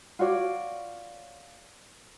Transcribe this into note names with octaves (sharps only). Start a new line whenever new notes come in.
F4 F#4 C#5 D5